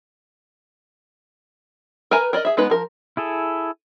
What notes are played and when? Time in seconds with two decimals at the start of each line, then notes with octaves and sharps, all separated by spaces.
2.11 A#4 B4 G#5 A#5
2.33 A#4 D5 D#5
2.45 G#4 E5
2.57 G#3 B3 D#4 B4
2.70 F3 A#4
3.17 E4 G#4 A4